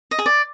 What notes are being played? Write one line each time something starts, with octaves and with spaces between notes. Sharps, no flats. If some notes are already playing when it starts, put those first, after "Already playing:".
D#5
G#4
D5